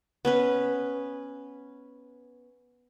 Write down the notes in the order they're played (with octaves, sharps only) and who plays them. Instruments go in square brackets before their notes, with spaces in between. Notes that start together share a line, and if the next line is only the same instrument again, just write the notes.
[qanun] B3 C#4 B4